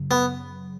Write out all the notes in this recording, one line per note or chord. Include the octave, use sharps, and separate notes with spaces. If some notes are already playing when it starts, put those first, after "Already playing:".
Already playing: F#2 C#3 F#3
B3